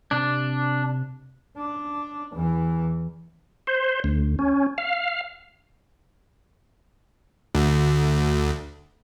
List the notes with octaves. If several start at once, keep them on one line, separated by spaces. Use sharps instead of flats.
C3 D4
D4
E2 E3
C5
D2
C#4
F5
D2